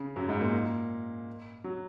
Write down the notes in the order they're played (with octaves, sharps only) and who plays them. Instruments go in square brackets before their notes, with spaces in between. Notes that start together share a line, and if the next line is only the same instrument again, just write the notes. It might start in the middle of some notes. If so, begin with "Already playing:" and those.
Already playing: [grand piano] C#3
F#2 F#3
G#2 G#3
A#2 A#3
F#3